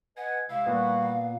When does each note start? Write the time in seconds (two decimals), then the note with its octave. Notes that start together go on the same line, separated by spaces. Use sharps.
0.17 B4 D#5 F#5 G#5
0.50 C3 G#3 E4 F5
0.66 A#2 G3 B3 E4 F#4